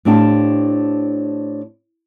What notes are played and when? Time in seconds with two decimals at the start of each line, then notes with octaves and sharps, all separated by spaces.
0.05 A2 C4 D4 G4 F5 A5